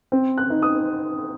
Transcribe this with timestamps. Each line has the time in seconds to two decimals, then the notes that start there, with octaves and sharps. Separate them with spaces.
0.12 C4
0.38 F#6
0.50 D#4
0.62 D#6